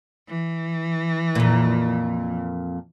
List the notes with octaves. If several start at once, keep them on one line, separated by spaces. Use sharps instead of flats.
E3
F2 A#2